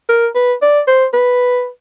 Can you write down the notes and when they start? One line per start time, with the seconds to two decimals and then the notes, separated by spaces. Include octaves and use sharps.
0.09 A#4
0.35 B4
0.62 D5
0.88 C5
1.14 B4